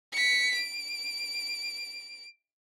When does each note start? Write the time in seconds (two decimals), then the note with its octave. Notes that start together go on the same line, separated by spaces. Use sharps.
0.12 B6 C#7
0.55 D7